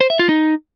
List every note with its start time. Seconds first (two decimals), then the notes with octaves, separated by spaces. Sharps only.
0.01 C5
0.10 E5
0.19 F4
0.29 D#4